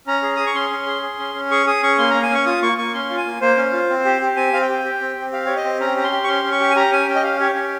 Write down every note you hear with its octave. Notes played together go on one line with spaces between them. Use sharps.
C#4 A#5
G#4
G#4 D#6
C#6
C#4 C6
C#4
G#4
G#4
C#4
C#4
G#4 C#6
G#4 D#6
C#4 C#6
A#3 C6
A#3 A#5
G#5
C#4 C#6
F4 D#6
A#3 C#6
A#3 C#6
C#4 C6
F4
G#5
A#3
A#3 C5
C#4
F4
C4
G4
G4
C4 G#5
C4 F5
G5
G4
G4
C4
C4
G4 F5
G4 C#5
D#5
C4
C#4 A#5
G4 A#5
C6
G4
C#6
C#4 C6
C#4
C#6
G4
G#5
G4 A#5
C#4 G#5
C#4 G5
D#5
G4 F5
G4 C#5
C#4 C#5